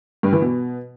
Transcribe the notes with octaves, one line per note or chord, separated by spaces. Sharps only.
G2
E3
B2